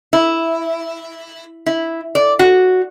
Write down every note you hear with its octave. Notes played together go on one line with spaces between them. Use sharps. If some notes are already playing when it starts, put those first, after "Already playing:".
E4
E4
D5
F#4